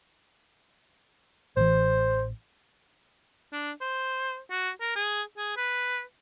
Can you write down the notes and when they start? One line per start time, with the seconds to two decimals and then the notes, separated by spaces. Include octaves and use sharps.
1.57 A1 E3 C5
3.52 D4
3.81 C5
4.51 F#4
4.81 A#4
4.96 G#4
5.38 G#4
5.57 B4